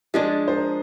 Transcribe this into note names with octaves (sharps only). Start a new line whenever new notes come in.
F3 G#3 D4 G#4
C5
A#4